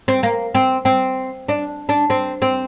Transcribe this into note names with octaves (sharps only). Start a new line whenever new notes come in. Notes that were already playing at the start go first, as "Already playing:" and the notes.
C4
A#3
C4
C4
D4
D4
C4
C4